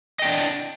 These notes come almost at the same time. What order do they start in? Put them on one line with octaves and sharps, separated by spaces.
D#5 G5 D4